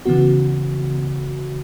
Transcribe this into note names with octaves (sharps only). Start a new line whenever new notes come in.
C#3 E3 B3 F#4